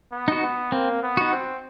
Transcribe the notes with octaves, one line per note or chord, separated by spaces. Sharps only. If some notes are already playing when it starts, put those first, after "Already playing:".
B3
D#4 F#4
B3
A#3 C4
B3
D#4 F#4
C4